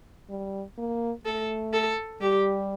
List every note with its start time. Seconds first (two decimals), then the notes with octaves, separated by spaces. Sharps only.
0.29 G3
0.78 A#3
1.25 A3 A4
1.73 A4
2.21 G3 G4